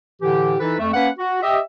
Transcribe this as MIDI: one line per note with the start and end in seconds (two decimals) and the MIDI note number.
0.21 0.55 45
0.21 0.55 50
0.21 0.55 52
0.21 0.55 67
0.60 0.76 52
0.60 0.76 63
0.60 0.76 64
0.60 0.76 69
0.60 0.76 71
0.79 0.91 41
0.79 0.91 57
0.94 1.09 58
0.94 1.09 61
0.94 1.09 71
0.94 1.09 78
1.18 1.41 66
1.42 1.60 67
1.42 1.60 75
1.42 1.60 76